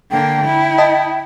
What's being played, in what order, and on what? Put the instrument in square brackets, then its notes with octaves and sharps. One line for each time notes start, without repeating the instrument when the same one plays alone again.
[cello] D3 A#3 [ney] G5
[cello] E4
[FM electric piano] D#5 A5